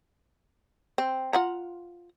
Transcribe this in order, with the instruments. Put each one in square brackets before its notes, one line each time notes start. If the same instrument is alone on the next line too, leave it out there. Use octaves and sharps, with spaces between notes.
[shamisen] C4
F4 F#5 A#5